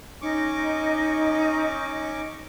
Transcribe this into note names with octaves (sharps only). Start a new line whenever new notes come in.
C#4 D#4 C#6 D6